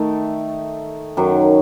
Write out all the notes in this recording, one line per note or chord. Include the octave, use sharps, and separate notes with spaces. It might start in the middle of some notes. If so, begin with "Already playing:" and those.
Already playing: D#3 A3 D#4
F#2 D#3 F#3